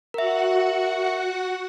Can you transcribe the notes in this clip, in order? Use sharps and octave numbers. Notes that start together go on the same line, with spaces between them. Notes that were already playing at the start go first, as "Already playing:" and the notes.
F#4 A#4 E5 F#5